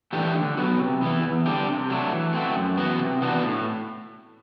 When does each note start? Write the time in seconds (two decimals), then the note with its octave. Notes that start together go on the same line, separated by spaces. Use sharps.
0.13 E3 A3 D4 G4
0.36 D3
0.57 F#3 B3 F#4
0.79 C3
1.01 E3 B3 E4
1.24 E2
1.45 D3 G3 D4 G4
1.67 C3
1.90 F#3 A3 D4
2.11 E3
2.33 A3 C4 F#4
2.56 F#2
2.77 E3 B3 F#4
2.99 C3
3.22 E3 B3 D4 F#4
3.43 A2